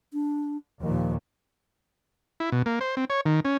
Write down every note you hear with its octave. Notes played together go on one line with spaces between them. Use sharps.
D4
D#2 A#2 F3
E4
B2
A#3
C5
C4
C#5
D#3
C#4